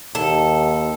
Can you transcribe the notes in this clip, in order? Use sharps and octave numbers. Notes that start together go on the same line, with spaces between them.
D#2 A4